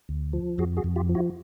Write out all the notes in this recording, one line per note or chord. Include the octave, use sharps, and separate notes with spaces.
D2
F3
F2 F#4 G#4
F#4 G#4
F2
F4 G4
F3
E4 F#4